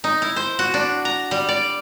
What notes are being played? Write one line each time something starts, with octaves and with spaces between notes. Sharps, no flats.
D#4
E4
C5
F#4
D4
A#5
G3
D5